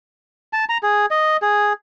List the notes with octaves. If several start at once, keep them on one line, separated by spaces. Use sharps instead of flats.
A5
A#5
G#4
D#5
G#4